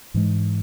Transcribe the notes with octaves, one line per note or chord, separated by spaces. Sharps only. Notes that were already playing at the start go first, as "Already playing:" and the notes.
G#2 E3 G#3